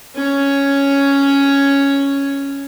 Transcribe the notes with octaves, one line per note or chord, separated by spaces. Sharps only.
C#4 C#5